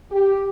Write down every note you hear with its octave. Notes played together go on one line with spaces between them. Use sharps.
G4